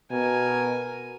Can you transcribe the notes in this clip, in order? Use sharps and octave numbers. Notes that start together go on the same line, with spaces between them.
B2 A#4 G#5